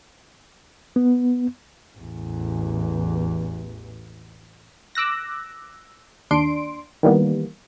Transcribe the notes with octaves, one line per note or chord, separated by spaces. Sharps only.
B3
A1 E2
D6 E6 F#6 A#6
D#2 D4 C6 D7
D#3 E3 G3 A#3 B3